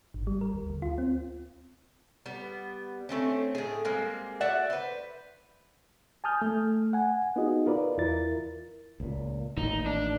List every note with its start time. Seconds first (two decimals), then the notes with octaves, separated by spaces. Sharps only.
0.14 G#1
0.27 G3
0.41 A#4
0.54 D#2
0.70 D2
0.82 F4
0.98 C4
2.26 G3 B3
3.09 A3 C4 C#4
3.55 A2 G#4
3.85 G3 G#3 A#3 C4
4.41 F#4 D5 E5 F#5
4.70 B4 C5
6.24 G#5 A5 D#6 F6 G6
6.42 A3
6.93 F#5 G#5
7.36 B3 D#4 F4 F#4 G#4 D#5
7.66 F4 A#4 B4 D5
7.98 E2 E4 F4 A#4 A6
9.00 C#2 A#2
9.57 A1 A#2 D#3 D#4
9.86 D4